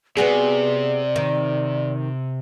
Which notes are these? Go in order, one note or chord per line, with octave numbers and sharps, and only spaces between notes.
C3 B3 F#4 G#4 D5
D#3